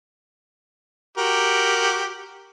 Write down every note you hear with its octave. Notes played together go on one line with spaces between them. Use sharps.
F#4 G4 A#4